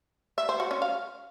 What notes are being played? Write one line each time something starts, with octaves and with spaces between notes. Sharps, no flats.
E5
C5
F#4
C#4
F5